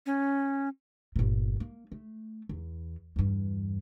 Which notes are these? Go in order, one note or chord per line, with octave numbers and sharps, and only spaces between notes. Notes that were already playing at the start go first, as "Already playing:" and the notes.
C#4
G1 A#2
A#3
A3
E2
E2 G2